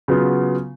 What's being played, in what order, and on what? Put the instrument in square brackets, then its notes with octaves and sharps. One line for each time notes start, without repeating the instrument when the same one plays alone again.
[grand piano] C#3 F#3 B3 F4